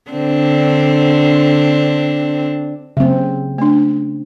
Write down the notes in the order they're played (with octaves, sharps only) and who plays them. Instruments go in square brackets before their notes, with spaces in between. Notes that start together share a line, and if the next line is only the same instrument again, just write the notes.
[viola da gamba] D3 C4 D4
[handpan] C#3 C4 [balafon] F#3 A#3
[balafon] A3 D4